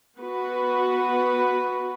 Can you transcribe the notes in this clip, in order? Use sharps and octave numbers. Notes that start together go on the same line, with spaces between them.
B3 F#4 B4